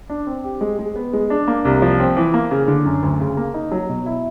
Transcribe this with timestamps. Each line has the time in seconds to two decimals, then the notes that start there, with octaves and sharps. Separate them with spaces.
0.10 D4
0.27 C4
0.44 G4
0.61 G#3
0.79 G#3
0.96 B3
1.13 G#3
1.30 D4
1.48 A#3
1.65 C2
1.82 F3
2.00 C4
2.17 E3
2.34 A#3
2.51 C#3
2.68 D3
2.85 F#2
3.03 D2
3.20 C#3
3.37 A#3
3.54 D#4
3.72 F#3
3.89 B2
4.06 E4